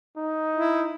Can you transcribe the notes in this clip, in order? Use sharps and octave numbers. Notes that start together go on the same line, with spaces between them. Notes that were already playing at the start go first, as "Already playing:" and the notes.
D#4
E4